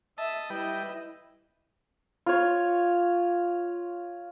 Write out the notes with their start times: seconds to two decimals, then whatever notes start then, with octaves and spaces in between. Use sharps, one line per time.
0.18 D#5 E5 A5
0.50 G3 E4 B4 D#5 G5
2.26 F4 C#5